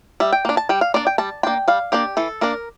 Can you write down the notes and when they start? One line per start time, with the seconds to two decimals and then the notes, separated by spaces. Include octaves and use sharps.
0.20 G3 E5
0.32 G5
0.45 A#3 D4
0.57 A5
0.69 G3 G5
0.81 F5
0.94 A#3 D4 D5
1.07 G5
1.18 G3 A5
1.43 A#3 D4 G5
1.68 G3 F5
1.92 A#3 D4 G4
2.17 E3 A4
2.41 A#3 D4 A#4